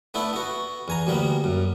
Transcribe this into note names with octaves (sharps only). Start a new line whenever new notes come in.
A3 B3 D4 E4
B3 F#4
E2 G#5 A#5
D2 G3 A#3 B3
F#2